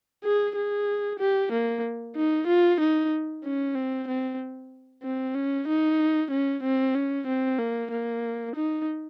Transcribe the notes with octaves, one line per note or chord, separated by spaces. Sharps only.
G#4
G#4
G4
A#3
D#4
F4
D#4
C#4
C4
C4
C4
C#4
D#4
C#4
C4
C#4
C4
A#3
A#3
D#4